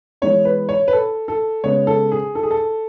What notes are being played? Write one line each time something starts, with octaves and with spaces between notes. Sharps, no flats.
E3 G#3 B3 C#5
B4
C#5
B4
A4
A4
C#3 G#3 B3 C#5
A4
G#4
A4
G#4
A4